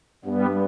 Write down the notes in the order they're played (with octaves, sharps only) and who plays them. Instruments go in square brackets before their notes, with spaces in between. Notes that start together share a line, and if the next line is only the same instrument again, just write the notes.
[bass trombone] G2 [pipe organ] G3 B3